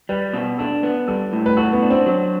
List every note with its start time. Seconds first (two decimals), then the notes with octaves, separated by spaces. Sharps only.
0.09 G3 B4
0.33 B2
0.58 D4 A4
0.83 B3
1.08 G3 A4
1.33 A2
1.46 B4
1.57 F#4 A4
1.73 B3
1.82 D4
1.90 C4
2.06 F#3